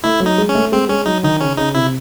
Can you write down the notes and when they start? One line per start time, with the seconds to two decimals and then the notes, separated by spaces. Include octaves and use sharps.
0.04 A3 E4
0.20 F#3
0.26 D#4
0.38 G#3
0.49 C#4
0.55 A3
0.72 G#3 C4
0.89 G#3 C#4
1.06 F#3 D#4
1.23 D#3 D#4
1.41 C#3 C#4
1.57 C#3 D#4
1.75 C3 E4